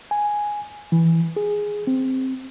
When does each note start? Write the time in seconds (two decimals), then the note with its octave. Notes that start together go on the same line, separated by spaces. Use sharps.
0.11 G#5
0.92 E3
1.36 G#4
1.87 C4